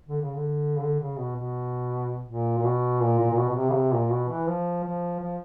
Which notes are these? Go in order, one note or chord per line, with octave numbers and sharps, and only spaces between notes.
D3
C#3
D3
C#3
D3
C#3
B2
B2
A#2
A#2
B2
A#2
A#2
A#2
B2
B2
C3
C#3
C3
A#2
B2
E3
F3
F3
F3